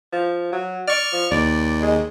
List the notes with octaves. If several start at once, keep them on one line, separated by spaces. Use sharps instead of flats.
F3
F#3
D5 C#6 F6
F3
D#2 D5
G#3